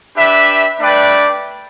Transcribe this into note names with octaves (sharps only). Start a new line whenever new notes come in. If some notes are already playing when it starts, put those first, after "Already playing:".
D4 G4 B4 E5
A3 D4 B4 D5 G5